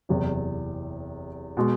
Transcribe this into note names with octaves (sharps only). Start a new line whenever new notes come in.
F#1 E2 C3
B2 G#3